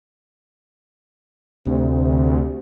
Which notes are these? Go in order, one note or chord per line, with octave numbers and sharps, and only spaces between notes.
D2 C3